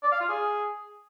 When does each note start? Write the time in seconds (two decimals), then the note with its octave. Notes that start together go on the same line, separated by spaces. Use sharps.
0.03 D5
0.12 F5
0.21 F4
0.29 G#4